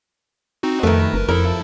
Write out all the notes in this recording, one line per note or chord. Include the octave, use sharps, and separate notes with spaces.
C4 D#4 F#4
F2 D#3 A3 A#4 B4
F#1
F2 F3 E4 A4 A#4